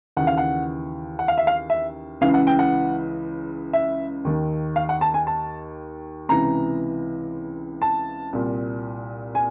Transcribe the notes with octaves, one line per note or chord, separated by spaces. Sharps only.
D#2 C#3 E3 F#5
F5
F#5
F#5
F5
E5
F5
E5
C#2 C#3 E3 F5
F#5
G5
F#5
E5
D#2 D#3
F5
F#5
A5
G#5
A5
C#2 C3 E3 A#5
A5
C2 A#2
G#5